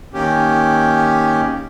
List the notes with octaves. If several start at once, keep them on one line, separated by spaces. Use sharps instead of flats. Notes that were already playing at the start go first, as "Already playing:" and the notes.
D#3 A#3 C#4 G4